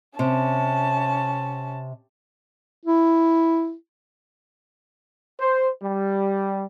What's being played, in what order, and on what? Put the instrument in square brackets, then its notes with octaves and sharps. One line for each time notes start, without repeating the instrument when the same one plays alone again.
[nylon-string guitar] C3 [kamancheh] C#4 A5
[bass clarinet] E4
[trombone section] C5
G3